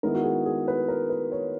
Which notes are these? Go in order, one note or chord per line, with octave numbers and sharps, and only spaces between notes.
D#3 G#3 B3 E4 A#4
F#4
G#4
G#4
B4
A#4
B4
C#5